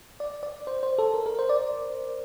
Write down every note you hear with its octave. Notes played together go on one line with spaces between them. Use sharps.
D5
D5
C5
C5
A4
A#4
A#4
C5
D5